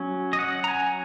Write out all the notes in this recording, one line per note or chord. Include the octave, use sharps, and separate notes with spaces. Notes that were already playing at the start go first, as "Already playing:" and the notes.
Already playing: F#3 C#4
D#5
F#5
A#5
G#5